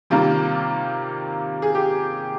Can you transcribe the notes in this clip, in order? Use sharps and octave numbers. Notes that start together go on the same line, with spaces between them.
C3 D#3 G3 A#3 F4
G#4
G4